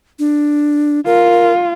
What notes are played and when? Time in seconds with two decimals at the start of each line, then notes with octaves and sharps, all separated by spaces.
0.19 D4
1.06 F4 A#4